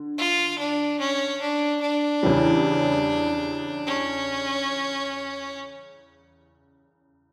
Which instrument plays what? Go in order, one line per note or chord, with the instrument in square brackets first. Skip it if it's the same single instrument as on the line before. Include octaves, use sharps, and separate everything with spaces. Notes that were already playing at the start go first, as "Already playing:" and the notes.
Already playing: [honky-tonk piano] D3
[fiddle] F4
D4
C#4
D4
D4
[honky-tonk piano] E2 C#3 E3 G3 C#4
[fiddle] C#4